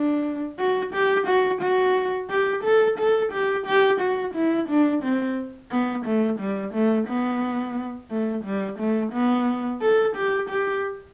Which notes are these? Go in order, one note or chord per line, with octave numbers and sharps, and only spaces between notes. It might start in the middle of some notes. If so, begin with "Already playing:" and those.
Already playing: D4
F#4
G4
F#4
F#4
G4
A4
A4
G4
G4
F#4
E4
D4
C4
B3
A3
G3
A3
B3
A3
G3
A3
B3
A4
G4
G4